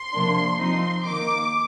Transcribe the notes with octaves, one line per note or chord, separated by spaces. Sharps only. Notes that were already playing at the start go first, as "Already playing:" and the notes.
Already playing: C6
C3 F3 A#3 D4
F3 C4 D#4 C6
D#3 A#3 D#4 D6